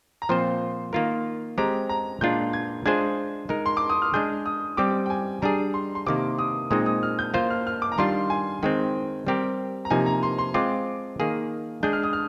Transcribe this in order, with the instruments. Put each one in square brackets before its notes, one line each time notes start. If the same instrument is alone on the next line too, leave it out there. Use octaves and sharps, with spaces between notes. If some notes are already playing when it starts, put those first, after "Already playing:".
[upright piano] A#5
[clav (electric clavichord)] A#2 F3 C4 F4 C5 [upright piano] C6
[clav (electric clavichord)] D#3 A#3 F4 A#4
[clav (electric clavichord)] G#3 C4 G4 C5 [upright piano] A#5
[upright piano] A#5
[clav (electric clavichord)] A#2 G#3 D4 F4 [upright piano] G6
[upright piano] G#6
[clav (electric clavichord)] G#3 D4 F4 G#4 C5 [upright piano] G#6
[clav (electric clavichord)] G#3 D#4 A#4
[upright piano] C6
D6
D#6
F6
[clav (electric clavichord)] G#3 D4 G#4 [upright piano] G6
[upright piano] D#6
[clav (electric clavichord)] G3 C4 G4 [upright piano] D6
[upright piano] G5
G#5
[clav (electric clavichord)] G3 D4 G#4 [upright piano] A#5
[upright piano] C6
C6
[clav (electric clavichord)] C3 D#3 A#3 [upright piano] D6
[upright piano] D#6
[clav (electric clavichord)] A#2 G#3 C4 D#4 [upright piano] D#6
[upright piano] D#6
F6
G6
[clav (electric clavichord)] A#3 F4 C5 [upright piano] G6
[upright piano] F6
F6
D6
A#5
[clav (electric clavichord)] D#3 G3 D4 F4 [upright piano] C6
[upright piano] G#5
[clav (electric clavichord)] D#3 G#3 C4 [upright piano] G5
[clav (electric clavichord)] G3 C4 G4 A#4
[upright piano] A#5
[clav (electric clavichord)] C3 F3 A#3 D#4 [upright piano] G#5
[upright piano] A#5
C6
C6
[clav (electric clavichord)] G#3 C4 F4 [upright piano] D6
[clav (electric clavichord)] D#3 A#3 F4 G#4
[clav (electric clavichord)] G#3 D4 G#4 [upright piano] G6
[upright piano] F6
D#6
F6